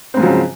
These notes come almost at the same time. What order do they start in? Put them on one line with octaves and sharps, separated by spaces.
C4 G#2 F3 F#3 C#3